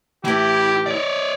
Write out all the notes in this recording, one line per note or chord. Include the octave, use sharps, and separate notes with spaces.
A2 E3 E4 G4
C#5 D5